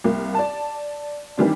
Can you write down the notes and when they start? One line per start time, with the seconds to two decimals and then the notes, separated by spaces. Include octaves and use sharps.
0.04 C2 A#3
0.35 D5 A5
1.37 D#3 E3 G3 C4 D4